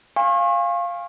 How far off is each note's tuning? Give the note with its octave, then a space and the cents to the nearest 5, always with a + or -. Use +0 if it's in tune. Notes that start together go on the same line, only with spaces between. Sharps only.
F5 -5 G#5 -35 C#6 -40